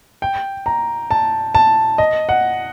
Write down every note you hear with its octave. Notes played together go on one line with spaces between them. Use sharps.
G5
A#5
A5
A5
D#5
F#5